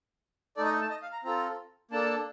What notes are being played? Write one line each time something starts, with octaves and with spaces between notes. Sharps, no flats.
A3 D#4 A4 D5
D#5
A5
D#5
F5
A#5
C4 F4 A4 A#5
A#3 D4 A4 A5